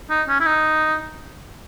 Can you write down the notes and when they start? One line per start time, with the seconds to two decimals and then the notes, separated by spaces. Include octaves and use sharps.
0.10 D#4
0.28 C#4
0.40 E4
0.46 D#4